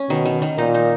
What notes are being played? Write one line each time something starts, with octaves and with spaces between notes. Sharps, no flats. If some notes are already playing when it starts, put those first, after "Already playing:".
Already playing: C#4
B2 D#3
D#3
D#3
A#2 D#4
D#4